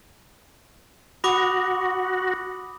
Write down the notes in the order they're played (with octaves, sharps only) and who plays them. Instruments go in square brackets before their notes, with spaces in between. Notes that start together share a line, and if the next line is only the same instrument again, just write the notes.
[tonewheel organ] F#4 [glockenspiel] B5 D6 D#6